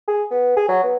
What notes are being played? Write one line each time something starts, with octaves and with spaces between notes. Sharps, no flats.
G#4
B3
G#4
F#3
B3